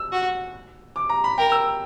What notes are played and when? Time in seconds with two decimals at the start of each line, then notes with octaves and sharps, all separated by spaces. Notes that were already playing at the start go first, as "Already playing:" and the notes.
Already playing: E6
0.12 F#4
0.96 D6
1.09 A#5
1.24 B5
1.38 A#4 G5
1.52 E6